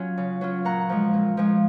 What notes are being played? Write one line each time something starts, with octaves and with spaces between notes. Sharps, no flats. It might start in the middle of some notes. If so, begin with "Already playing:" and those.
Already playing: F#3 C#4 F4 G#5
C#3
F#3 C#4 F4
A#2 F#5 A#5
F3 G#3
A#2
F3 G#3